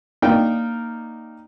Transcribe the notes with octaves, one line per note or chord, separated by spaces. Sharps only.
A#3 D#4 A#4 D5 G5